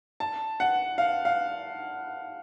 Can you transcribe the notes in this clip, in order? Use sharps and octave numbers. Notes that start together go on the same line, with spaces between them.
A5
F#5
F5
F5